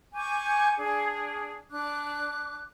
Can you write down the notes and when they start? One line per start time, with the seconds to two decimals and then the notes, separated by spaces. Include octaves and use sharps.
0.14 G#5 C#6 D6 G6
0.77 D4 G#4
1.69 D4 D6 F#6